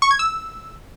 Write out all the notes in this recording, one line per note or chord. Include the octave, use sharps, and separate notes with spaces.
C#6
G#6
E6